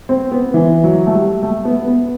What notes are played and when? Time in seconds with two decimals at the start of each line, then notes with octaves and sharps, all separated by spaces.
0.09 C4
0.32 B3
0.54 E3
0.84 F#3
1.07 A3
1.14 G3
1.43 A3
1.65 B3
1.88 B3